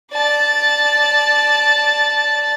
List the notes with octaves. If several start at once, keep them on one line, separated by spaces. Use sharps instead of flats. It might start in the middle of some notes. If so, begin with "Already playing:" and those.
D5 A5